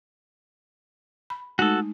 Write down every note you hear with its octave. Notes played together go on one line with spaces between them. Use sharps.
B5
G#3 A3 D#4 F#4 A4